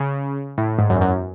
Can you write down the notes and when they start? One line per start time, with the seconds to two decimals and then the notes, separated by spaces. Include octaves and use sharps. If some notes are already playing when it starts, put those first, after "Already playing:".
Already playing: C#3
0.58 A2
0.79 G#2
0.90 F#2
0.96 E2
1.01 F#2